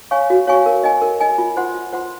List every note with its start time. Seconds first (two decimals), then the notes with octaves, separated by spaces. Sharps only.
0.11 C#5 F5 G#5 C#6
0.30 F#4
0.47 C#5 F5 G#5 C#6
0.66 A#4
0.83 D#5 G#5
1.02 A#4
1.20 D#5 G#5
1.38 F4
1.57 C5 F#5 C6
1.75 F4
1.93 C5 F#5 C6